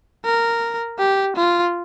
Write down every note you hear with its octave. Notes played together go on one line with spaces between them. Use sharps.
A#4
G4
F4